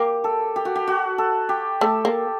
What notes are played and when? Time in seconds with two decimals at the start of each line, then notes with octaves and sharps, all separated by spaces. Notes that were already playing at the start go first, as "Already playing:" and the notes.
Already playing: A#3 G4
0.24 A4
0.56 G4
0.65 F#4
0.76 G4
0.87 F#4
1.18 A4
1.49 G4
1.81 A3 A4
2.05 A#3